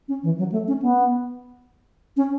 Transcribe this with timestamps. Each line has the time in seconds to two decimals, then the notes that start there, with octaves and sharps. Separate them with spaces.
0.08 C#4
0.23 E3
0.38 F#3
0.52 A3
0.68 C#4
0.82 B3
2.17 C#4